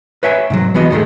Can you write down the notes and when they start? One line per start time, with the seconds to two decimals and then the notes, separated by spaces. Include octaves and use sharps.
0.23 B4 C#5 E5 G5 G#5
0.50 G#2 C3 F#3
0.74 C2 E3 B3 F#4 D#5
0.90 D#2 G#2 D#3 F3 G#3 A3